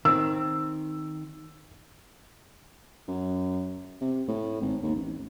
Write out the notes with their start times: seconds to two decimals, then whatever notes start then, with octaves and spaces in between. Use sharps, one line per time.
0.05 D#3 C4 E6
3.08 F#2
4.01 C3
4.28 A2
4.61 G#1
4.83 D#2
4.95 A1